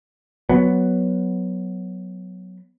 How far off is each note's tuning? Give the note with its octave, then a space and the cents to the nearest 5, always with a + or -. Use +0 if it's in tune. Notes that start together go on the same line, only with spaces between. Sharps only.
F#3 +0 B3 +0